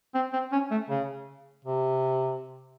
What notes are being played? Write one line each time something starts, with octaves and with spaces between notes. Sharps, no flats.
C4
C4
C#4
A3
C#3
C3